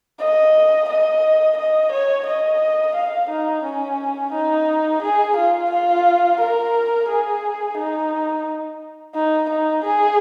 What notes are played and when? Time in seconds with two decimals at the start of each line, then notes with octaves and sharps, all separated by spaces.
0.20 D#5
0.89 D#5
1.57 D#5
1.92 C#5
2.26 D#5
2.95 F5
3.29 D#4
3.63 C#4
4.32 D#4
5.02 G#4
5.36 F4
5.70 F4
6.40 A#4
7.08 G#4
7.77 D#4
9.14 D#4
9.49 D#4
9.84 G#4